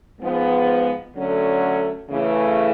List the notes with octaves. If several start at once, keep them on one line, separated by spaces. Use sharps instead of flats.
G#2 F3 G#3 B3
D3 F#3 A3 C#4
C#3 E3 A3